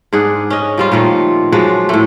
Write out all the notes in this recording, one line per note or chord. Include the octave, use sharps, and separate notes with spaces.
G#2 D4 G#4 F#5
C#4 D#5
F3 G3 F4
A#2 D#3 F3 A3
F3 F#3 G#3 D4
A2 A3